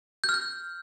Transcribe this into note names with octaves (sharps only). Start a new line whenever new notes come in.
G6
F6
G6